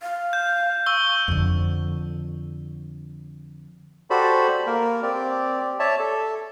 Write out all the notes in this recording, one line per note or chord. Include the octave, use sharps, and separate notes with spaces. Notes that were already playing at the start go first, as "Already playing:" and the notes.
F5
G6
C#6 E6 G7
F2 D3
F#4 G4 A4 C5 D5 B5
A#3 A#4
C4 G4 D5
C#5 D5 E5 A5
A4